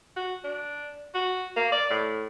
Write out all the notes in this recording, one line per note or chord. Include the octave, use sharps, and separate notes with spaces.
F#4
D4
F#4
A#3
D5
A2